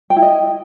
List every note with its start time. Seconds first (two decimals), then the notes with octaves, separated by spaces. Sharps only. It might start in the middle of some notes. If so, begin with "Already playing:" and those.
0.10 G5
0.16 E4
0.22 D#5